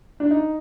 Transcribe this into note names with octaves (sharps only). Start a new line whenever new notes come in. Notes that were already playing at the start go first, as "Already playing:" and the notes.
D4
D#4